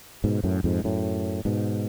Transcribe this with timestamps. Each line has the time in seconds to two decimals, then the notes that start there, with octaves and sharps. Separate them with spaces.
0.24 G#2 B2
0.44 F#2 A2
0.64 F2 G#2
0.84 F#2 A2
1.45 G#2 B2